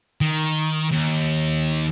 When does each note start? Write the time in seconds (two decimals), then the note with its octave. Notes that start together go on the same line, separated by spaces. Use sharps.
0.21 D#3
0.92 D#2